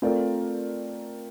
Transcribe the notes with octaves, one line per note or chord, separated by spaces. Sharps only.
A3 C4 F4 A#4 D5